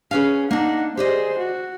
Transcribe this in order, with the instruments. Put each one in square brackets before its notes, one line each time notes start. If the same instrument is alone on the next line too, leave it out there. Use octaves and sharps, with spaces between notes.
[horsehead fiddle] C#4 [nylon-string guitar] G#4 B4 F5
[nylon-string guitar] A#3 D4 [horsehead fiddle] D#4 F#5
[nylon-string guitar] G4 D5 D#5 [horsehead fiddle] G#4 C5
[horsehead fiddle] F#4